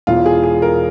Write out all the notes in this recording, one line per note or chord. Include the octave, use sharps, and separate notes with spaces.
E1 E2 E3 F4
G#4
G#4
A#4